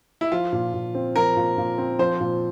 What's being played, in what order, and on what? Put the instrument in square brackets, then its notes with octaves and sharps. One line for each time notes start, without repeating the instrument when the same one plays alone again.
[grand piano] E4
[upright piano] F3 [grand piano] F4
[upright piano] A#2
A#2
C4
[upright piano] F3 [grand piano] A#4
[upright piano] A#2
A#2
C4
[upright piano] F3 [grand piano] C5
[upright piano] A#2